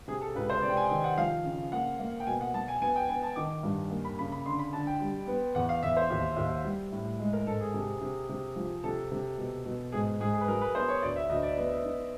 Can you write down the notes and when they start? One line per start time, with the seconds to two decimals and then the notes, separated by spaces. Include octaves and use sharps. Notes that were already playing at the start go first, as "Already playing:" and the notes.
0.07 C3 G#4
0.21 A4
0.35 C#2 B4
0.50 C5
0.62 C3 D5
0.69 G5
0.77 G#5
0.90 D#3 G5
1.04 F#5
1.17 F3 F5
1.44 C#3
1.72 A#3 F#5
2.00 A#3
2.20 G5
2.27 B2 G#5
2.41 F#5
2.54 F#3 A5
2.68 G#5
2.82 B3 G#5
2.96 G5
3.09 B3 G#5
3.23 A5
3.36 D#3 D6
3.63 G2
3.91 A#3
4.05 B5
4.19 C#3 B5
4.32 B5
4.46 D3 C6
4.59 B5
4.73 D3 A5
4.87 G5
5.00 G3
5.27 B3
5.55 E2 F#5
5.69 F5
5.83 E2 E5
5.97 C5
6.10 D#2
6.37 D#2
6.64 G3
6.92 A2
7.19 G#3
7.33 A#4
7.47 G#2 A4
7.61 G#4
7.74 C3
8.01 C3
8.29 C3
8.56 F3
8.84 C3 A4
9.11 C3
9.38 B2
9.66 B2
9.92 G#2 G#4
10.20 G#2 G#4
10.33 G#4
10.41 B4
10.48 F#3 A#4
10.61 B4
10.75 B3 C5
10.88 C#5
11.02 D2 D5
11.16 E5
11.29 D2 D#5
11.43 D5
11.57 B3
11.85 D#4